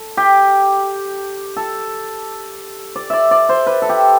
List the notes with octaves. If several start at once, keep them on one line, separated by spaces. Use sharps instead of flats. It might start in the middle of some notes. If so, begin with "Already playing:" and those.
Already playing: A4
G4
A4
D5
D5 E5
D5
C5
B4
A4
G4